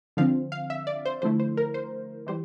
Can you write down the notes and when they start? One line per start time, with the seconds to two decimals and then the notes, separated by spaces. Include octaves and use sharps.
0.17 D3 F3 C4 F5
0.52 F5
0.70 E5
0.87 D5
1.05 C5
1.22 D3 F3 A3 E4 C5
1.40 C5
1.57 A#4
1.74 C5
2.27 E3 G3 C5